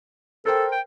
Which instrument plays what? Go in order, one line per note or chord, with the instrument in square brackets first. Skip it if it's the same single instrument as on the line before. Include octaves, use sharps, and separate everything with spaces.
[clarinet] A4 [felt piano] A#4 C5 G5
[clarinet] G5